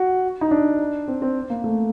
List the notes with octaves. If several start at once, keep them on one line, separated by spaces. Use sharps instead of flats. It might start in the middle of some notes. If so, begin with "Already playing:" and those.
Already playing: F#4
D#4
D4
C4
C4
A#3
A3